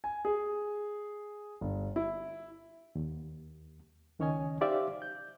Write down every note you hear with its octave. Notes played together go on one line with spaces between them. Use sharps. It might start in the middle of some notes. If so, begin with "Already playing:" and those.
G#5
G#4
G1
E4
D#2
C#2 D#3 C#4 C#5 D#5 G#5
D#4 G4 C5 D5 E5 F5
G6